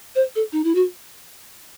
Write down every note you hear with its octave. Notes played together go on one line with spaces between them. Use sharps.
C5
A4
D#4
E4
F#4